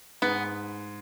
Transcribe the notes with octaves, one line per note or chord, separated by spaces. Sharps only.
G#2 B3